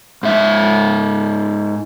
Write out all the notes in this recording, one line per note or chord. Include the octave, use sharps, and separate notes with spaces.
G#2 E5